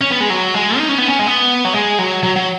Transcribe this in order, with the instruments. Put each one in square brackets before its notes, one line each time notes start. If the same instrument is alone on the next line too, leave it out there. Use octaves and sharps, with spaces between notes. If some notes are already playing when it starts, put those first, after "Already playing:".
[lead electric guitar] C#4
B3
G#3
F#3
G#3
D#4
C#4
B3
C#4
G#3
B3
F#3
G#3
F#3
F#3
F#3